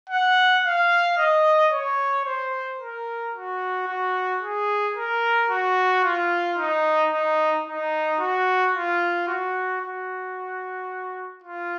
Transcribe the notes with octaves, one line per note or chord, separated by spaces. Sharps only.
F#5
F5
D#5
C#5
C5
A#4
F#4
F#4
G#4
A#4
F#4
F4
D#4
D#4
D#4
F#4
F4
F#4
F#4
F4